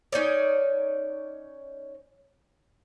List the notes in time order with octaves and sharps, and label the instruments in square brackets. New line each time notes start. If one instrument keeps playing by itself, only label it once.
[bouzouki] C#4 D#4 C#5 D5